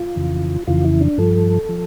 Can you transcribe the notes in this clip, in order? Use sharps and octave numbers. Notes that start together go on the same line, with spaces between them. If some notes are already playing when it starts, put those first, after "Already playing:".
Already playing: F4
F2 C#3 E3
F2 C#3 E3 F4
E4
D4
G2 F3 A4
F3